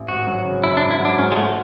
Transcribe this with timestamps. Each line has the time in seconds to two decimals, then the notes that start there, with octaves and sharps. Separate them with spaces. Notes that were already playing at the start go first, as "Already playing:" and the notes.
Already playing: A1
0.08 G#1 F#4
0.27 F#3
0.45 C#3
0.64 F#2 E4
0.77 D4
0.82 G#1
0.91 E4
1.00 F#3
1.05 D4
1.18 G#2 C#4
1.32 G#3
1.36 A3 F#4